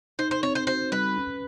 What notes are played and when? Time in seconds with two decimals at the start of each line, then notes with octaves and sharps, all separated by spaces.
0.19 D#4 C5
0.31 C5
0.43 C4 C#5
0.55 C5
0.67 F#4 C5
0.92 G3 B4
1.17 C#4